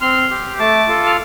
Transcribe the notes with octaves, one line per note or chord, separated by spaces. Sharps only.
C4 C6 F6
G4
A3 A5 D6
F4 A4
F6